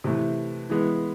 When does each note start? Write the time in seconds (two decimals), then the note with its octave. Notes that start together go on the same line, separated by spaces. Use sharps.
0.04 C3 E3 A3
0.70 E3 G#3 B3